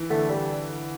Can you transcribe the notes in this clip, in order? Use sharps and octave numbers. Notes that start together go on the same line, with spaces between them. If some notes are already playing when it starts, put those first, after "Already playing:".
Already playing: E3
D3 A3
G3